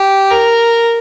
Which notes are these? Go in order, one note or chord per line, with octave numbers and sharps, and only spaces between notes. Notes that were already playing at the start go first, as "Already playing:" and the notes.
Already playing: G4
A#4